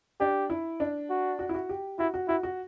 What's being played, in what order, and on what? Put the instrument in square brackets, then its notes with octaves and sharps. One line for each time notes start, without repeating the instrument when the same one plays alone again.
[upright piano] D4 [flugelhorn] G4
[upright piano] E4
D4
[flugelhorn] F#4
[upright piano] F#4
E4
F#4
G4
[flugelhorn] E4 [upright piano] F#4
[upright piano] F#4
[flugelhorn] E4 [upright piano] F#4
[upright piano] F#4